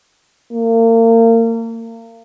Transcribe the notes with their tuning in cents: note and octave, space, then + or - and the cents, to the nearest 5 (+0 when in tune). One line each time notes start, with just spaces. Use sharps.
A#3 -35